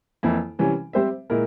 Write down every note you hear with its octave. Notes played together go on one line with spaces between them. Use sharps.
F2 E3 A#3 E4
C3 E3 G3 C#4
G3 C4 G4 C5 E5
A#2 G#3 E4 A#4